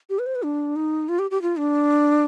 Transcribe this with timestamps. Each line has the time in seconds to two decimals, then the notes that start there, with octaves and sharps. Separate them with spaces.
0.10 G4
0.19 B4
0.26 C5
0.35 B4
0.43 D4
0.76 D#4
1.09 F4
1.19 G4
1.31 G4
1.42 F4
1.58 D4